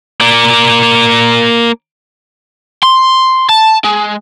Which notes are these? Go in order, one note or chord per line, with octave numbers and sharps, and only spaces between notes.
A#3 D5
C6
A5
G#3